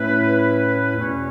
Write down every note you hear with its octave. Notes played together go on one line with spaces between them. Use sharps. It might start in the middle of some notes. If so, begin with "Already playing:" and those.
Already playing: A2 A3 C#4 E4 B4
E2 B2 A3 C#4